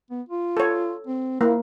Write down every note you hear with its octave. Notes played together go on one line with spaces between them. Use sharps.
B3
F4
A4 C#5
C4
A#3 E4